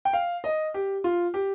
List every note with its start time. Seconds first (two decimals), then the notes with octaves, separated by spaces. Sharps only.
0.05 G5
0.13 F5
0.44 D#5
0.74 G4
1.04 F4
1.34 G4